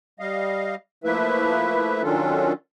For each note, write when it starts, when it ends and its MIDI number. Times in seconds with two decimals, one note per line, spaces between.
0.20 0.75 55
0.20 0.75 75
0.20 0.75 77
1.04 2.02 53
1.04 2.02 57
1.04 2.02 58
1.04 2.02 64
1.04 2.02 71
1.04 2.02 76
2.03 2.53 51
2.03 2.53 54
2.03 2.53 61
2.03 2.53 62
2.03 2.53 65
2.03 2.53 69